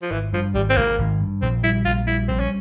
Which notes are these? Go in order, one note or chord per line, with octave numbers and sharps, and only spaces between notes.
F3
G#1 E3
G2 F3
G#1 G3
C4
G#1 A#3
G#1
G2
A#1 C4
G3 E4
A#1 F4
G3 E4
A#1 C4
C#4